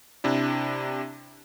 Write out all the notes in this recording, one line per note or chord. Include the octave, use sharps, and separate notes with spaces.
C3 D4 E4